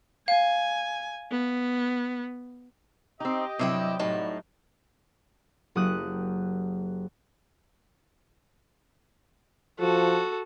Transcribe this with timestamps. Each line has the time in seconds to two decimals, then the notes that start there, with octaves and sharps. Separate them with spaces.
0.28 F5 G#5
1.31 B3
3.20 C4 D#4 G4 D#5
3.59 G2 C3 F#3 E4 G5
3.99 A2 G3 D#4 F#4 A5
5.75 F#1 F#3 A#3 G4 D#6 F#6
9.80 F3 F#4 A4